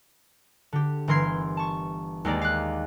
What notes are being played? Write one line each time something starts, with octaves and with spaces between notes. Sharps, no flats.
D3 G4
G1 E3 A#4 C6 G#6 C7
A5 C#6
D#2 G#3 A#4 D5
F5 F#6